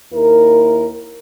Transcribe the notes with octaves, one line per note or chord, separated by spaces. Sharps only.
D#2 E4 A#4